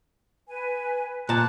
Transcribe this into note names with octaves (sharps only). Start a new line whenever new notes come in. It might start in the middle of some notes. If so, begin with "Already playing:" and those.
B4 G#5
A#2 A5 F#6